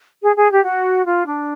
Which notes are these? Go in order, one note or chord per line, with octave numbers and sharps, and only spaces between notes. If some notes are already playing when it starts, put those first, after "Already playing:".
G#4
G#4
G4
F#4
F4
D4